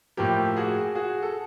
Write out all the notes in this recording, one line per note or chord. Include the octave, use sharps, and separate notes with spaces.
A2 F3 A#3 G4
F#4 G#4
F#4 G#4
A4